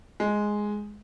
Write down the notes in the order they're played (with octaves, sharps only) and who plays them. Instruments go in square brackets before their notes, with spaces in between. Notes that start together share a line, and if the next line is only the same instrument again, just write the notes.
[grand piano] G#3